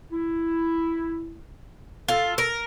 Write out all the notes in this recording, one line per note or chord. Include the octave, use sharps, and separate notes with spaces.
E4
F4 A4
A#4